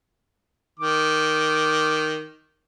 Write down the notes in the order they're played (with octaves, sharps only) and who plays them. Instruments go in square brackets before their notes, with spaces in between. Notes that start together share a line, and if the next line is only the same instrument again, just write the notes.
[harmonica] D#3 D6